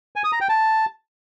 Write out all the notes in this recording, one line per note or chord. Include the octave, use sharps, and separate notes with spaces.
G#5
D#6
A#5
G5
A5